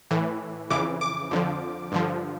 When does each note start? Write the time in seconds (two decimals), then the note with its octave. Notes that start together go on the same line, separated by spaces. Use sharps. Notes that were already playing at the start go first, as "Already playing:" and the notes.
0.11 A2 E3
0.70 F2 C#3 E3 D6
1.01 D6
1.31 F2 D3 F3
1.92 G2 D3 F3